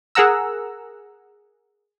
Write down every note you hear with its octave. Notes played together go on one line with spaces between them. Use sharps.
G#4 A#4 F#5 A#5 E6